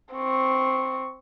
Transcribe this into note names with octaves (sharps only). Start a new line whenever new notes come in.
C4 C#6